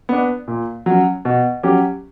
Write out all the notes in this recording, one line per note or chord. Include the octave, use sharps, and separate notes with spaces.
B3 D4
A#2
F#3 C#4
B2
F#3 C#4 G4